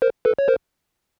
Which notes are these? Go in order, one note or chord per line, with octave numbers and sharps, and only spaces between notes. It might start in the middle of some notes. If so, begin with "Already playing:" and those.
A#4 C5
A4 B4
C#5
A#4 C5